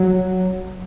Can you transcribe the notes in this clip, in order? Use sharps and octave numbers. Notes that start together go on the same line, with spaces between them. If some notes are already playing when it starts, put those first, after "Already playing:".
Already playing: F#3